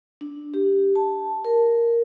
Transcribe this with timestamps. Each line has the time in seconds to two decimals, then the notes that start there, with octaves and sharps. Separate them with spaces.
0.21 D4
0.54 G4
0.96 A5
1.45 A#4